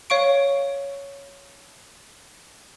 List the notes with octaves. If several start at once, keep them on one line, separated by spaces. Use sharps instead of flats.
C#5 F5 C#6 D7